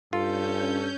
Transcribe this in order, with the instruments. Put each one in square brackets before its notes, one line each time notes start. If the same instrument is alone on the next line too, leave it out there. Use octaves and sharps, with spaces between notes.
[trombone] G2 [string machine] C#4 G6 [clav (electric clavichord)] F4 [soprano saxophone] A4